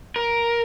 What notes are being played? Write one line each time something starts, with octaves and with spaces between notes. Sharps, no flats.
A#4